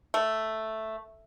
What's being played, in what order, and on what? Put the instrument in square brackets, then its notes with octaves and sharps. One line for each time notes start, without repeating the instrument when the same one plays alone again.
[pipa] A3